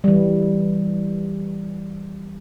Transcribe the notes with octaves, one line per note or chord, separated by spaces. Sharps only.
E3 G3